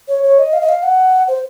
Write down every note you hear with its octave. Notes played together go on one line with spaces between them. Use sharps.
C#5
C#5
D#5
F5
D#5
F5
F#5
C5